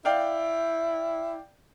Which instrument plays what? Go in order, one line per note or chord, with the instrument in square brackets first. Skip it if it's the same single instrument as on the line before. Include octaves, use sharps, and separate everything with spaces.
[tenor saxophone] E4 [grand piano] D5 F5 G5